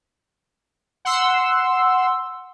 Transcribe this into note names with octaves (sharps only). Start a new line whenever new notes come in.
F#5 C6 E6